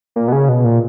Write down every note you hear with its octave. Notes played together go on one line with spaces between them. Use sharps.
A#2
B2
C#3
B2
A#2